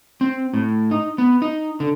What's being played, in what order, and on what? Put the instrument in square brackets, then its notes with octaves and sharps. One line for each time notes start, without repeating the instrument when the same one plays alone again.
[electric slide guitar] C4
A2
D#4
B3
D#4
D3